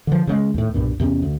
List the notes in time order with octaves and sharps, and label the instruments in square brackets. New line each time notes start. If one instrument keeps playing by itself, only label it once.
[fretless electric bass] D3 F3
C#3 F#3 G#3
D#2 A2
B1 G2 A#2
E2 C3 A#3 C#4
D2